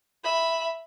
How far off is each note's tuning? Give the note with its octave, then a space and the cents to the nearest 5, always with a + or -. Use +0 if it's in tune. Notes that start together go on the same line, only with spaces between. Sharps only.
E5 +0 B5 +0